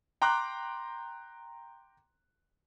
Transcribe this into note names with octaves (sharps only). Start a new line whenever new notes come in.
G5 A#5 C6 D6 F#6